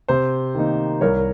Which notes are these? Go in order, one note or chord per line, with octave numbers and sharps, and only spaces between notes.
C3 C5
D#3 A#3 D#4
C2 A#4 C#5